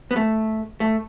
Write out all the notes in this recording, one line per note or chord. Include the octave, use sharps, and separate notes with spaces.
B3
A3
A3